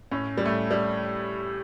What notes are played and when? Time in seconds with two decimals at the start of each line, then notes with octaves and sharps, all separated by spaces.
0.11 A2 C#4
0.37 G3
0.45 A2 A3
0.71 G3